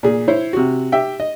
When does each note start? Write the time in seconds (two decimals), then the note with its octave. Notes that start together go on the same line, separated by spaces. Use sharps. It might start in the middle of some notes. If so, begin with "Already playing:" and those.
0.03 A#2 G#4
0.28 E4 C5 C#5
0.53 C3 F#4
0.92 G4 E5 G5
1.20 D#5